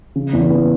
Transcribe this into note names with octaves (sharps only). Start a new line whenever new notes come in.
C#3
E2
B3